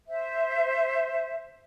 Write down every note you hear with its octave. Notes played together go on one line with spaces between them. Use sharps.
C5 E5